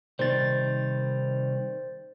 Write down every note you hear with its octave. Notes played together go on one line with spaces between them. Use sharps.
C3 D#3 G3 C5 A6